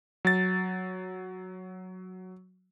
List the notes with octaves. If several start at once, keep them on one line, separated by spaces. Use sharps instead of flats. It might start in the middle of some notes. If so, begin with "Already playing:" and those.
F#3 A6